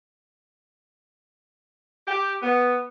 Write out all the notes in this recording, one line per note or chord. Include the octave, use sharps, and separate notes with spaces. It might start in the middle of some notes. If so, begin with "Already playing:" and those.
G4
B3